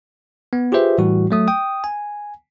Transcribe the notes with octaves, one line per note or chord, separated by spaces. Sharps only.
B3
F4 G4 G#4 B4 C5 E5
A2 E3 G3 F#4
F#3 A3 D#6
G5 D#6
G#5